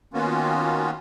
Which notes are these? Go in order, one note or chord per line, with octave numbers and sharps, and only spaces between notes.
D#3 A#3 B3 C#4 F4 F#4